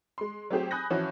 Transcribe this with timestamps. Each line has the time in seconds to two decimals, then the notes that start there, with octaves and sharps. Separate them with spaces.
0.18 G#3 C6
0.51 F#3 A3 C4 G4 G#4 C5
0.71 G#5 B5 D#6 F#6 G6 A#6
0.90 E3 F3 C#4 F#4